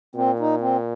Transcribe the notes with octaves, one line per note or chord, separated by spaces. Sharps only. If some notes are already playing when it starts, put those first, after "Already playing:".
A#2 C4
D#4
C4